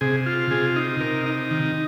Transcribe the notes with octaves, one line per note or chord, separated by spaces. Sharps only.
C3 G#4
F4
C3 G#4
D#4
C3 A#4
D#4
D#3